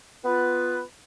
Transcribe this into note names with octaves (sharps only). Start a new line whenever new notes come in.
B3 F4 B4